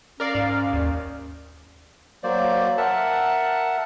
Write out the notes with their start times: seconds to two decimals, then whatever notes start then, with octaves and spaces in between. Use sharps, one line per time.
0.20 C#4 A#4 D5 F5
0.35 G#2
0.73 D#2
2.23 F#3 A#3 C5 D5
2.78 A#4 E5 F#5 A5